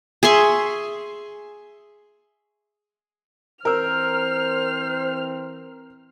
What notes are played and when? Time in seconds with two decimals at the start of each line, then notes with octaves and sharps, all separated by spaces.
0.23 G#4 E5 C6 C#6
3.65 E3 C4 A#4 C5 E6 F6